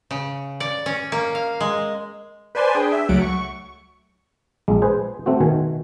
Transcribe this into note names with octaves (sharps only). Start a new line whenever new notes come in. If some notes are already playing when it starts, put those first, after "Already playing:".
C#3
D5
C#4
A#3
F5
G#3
B4 C5 D5 G#5 A5 C6
D4 G#4 G5
E5
C#2 F#3 A3 F#5 D7
C#6
A#1 G#3
G#4 B4 C5
A3 C4 F#4
B2 D#3 G#5